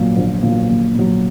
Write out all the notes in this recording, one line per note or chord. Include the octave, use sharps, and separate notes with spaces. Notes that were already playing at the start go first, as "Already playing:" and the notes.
Already playing: A#1 A#2 F#3
A#1
A#2 F#3
A#1
A#2 F#3